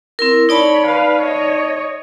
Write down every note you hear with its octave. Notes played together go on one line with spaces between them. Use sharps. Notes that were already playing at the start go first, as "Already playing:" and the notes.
C4 E4 A#4
D#4 C#5 D5 A5 B5
B4 F5
C#5 D#5